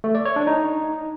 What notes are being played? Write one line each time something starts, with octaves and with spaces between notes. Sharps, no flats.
A3
D5
C#5
D4
D#4